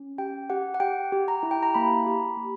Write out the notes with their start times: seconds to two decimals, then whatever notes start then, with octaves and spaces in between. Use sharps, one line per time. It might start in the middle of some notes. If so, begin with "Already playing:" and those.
Already playing: C#4
0.18 G4 G5
0.50 G4 F#5
0.74 F#5
0.80 G4 G5
1.12 G4
1.28 A#5
1.43 E4
1.51 G5
1.63 A#5
1.75 A#3 B5
2.06 G4
2.37 A#3